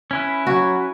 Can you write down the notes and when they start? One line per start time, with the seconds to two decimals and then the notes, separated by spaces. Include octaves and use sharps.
0.11 C#4 E4 B4
0.47 F#3 F#4